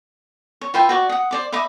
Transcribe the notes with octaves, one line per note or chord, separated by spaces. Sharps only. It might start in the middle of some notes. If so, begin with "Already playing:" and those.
C#5
F4 B4 E5 G5
F#4 D5 C#6
F#5 D#6
C5 D5 D6
D#5 E5 B5 D6